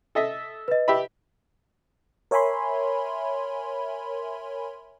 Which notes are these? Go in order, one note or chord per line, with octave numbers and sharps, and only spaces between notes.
A4 D#5 E5
B4 D#5
G4 E5 B5
A#4 C#5 E5 G#5 B5 C6